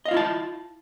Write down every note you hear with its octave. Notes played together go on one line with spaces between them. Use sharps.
E4 F4 D#5 F5 A5